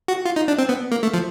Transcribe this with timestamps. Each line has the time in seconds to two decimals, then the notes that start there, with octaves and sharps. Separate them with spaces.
0.08 F#4
0.26 F4
0.36 D#4
0.48 D4
0.58 C4
0.69 B3
0.92 A#3
1.03 A3
1.14 F3